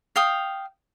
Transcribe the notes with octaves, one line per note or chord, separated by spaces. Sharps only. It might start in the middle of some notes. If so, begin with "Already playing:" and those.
F5 G5 D#6